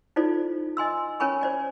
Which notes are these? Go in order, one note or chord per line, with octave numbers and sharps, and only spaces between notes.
D#4 F4 A4 C5 D5
D#5 G#5 C6 E6
C#4 A#4 C#5 G#5 B5 C#6
C5 D5 G#5